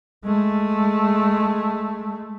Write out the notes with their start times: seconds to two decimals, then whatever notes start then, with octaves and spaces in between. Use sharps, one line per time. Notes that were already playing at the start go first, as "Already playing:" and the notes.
0.24 G#3 A3